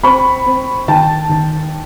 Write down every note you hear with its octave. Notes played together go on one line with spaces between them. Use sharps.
C4 B5 C#6
C4
D#3 G5 A5
D#3